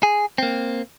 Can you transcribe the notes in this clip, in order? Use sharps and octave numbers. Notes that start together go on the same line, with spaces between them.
G#4
A#3 C4